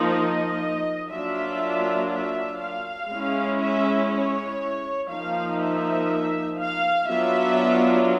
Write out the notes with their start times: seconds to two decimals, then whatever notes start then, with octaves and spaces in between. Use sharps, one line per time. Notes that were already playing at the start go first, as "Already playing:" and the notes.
Already playing: F3 A#3 D#4
0.12 D#5
1.11 F#3 A#3 D4 F4 E5
2.12 E5
2.61 F5
3.11 G#3 C#4 E4
3.62 E5
4.11 C#5
5.11 F3 A#3 D#4 F5
5.61 E5
6.60 F5
7.10 F#3 B3 D4 F4 E5